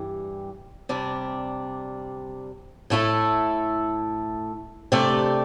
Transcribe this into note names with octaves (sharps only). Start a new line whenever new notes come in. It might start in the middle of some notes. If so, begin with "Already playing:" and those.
Already playing: G2 E3 G3
C3 G3 D4
A2 A3 E4 A4
C3 A3 D4 G4 D5